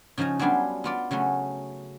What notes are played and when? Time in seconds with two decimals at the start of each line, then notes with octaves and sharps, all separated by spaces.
0.18 C#3 F3 D#4 G#5 A#5
0.39 F#3 G3 B3 D4 F4 G#4
0.84 B3 F4 D5
1.11 C#3 F#3 A3 C#4